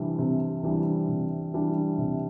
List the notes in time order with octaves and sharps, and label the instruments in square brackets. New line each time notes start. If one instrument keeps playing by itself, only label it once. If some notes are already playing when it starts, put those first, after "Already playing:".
Already playing: [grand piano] C3 E3 G3 D4
C3
E3 G3 D4
C3
E3 G3 D4
C3